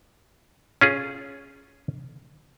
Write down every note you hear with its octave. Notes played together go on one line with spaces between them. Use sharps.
C#4 F4 G#4